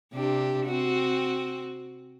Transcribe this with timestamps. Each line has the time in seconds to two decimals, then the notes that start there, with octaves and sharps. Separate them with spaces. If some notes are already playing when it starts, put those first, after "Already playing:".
0.13 C3 D4 G4
0.66 C4 F#4